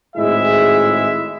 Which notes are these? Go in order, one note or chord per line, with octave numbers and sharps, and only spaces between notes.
G#1 A2 G#3 E4 G#4 E5